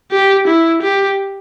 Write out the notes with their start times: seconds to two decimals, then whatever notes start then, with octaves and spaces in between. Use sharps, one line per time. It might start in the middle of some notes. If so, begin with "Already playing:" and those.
0.12 G4
0.47 E4
0.82 G4